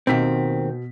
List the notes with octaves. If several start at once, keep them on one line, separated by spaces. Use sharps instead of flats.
D#2 B2 D#3 C4 B6